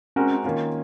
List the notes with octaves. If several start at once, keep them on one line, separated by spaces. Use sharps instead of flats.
G#3 C4 C#4 F#4 A#4
D#3 A#3 C#4 F4